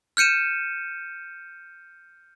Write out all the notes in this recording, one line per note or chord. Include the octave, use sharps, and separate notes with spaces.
F6 G6 C#7 D#7 E7